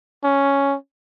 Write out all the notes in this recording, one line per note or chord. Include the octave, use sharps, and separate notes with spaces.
C#4